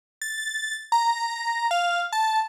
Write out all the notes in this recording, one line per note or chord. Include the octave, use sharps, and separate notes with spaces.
A6
A#5
F5
A5